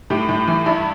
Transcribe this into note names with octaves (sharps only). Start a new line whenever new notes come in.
A2 G4
A2
E3
G2 E4